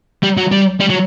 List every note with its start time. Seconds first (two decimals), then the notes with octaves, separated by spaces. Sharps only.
0.23 G3
0.37 F#3
0.52 G3
0.80 G3
0.90 F#3